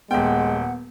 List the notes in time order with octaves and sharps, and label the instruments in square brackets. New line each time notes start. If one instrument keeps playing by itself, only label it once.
[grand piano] D#1 G5 [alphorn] G#3 [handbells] B3 [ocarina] F#5